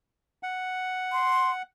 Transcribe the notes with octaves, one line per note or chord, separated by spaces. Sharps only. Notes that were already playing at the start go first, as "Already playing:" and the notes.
F#5
C6